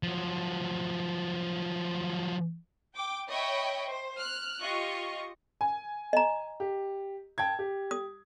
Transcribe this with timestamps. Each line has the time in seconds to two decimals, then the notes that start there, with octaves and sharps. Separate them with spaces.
0.03 F3 F#3
2.95 G5 D6
3.29 C#5 D#5 E5 G5 B5 C#6
3.86 C5
4.17 F6 F#6
4.62 F4 G4 D#5 C#6
5.61 G#5
6.13 D#5 A#5
6.60 G4
7.38 G5 A5 G#6
7.59 G4
7.91 D#6